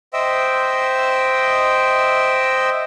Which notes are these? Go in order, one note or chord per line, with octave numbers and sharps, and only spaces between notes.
C5 D#5 E5 G5 E6